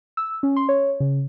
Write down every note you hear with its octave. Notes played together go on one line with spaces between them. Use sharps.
E6
C#4
C6
C#5
C#3